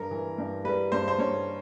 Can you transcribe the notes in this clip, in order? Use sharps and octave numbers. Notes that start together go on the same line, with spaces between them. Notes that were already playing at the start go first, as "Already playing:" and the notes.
Already playing: G2 A#4
E3
G2
G3 B4
G2 C5
C5
G2 C#5